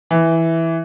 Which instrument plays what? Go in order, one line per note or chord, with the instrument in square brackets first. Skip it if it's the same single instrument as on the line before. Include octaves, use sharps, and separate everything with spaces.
[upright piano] E3